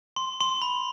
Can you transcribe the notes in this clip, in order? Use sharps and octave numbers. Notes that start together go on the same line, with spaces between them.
C6
C6
B5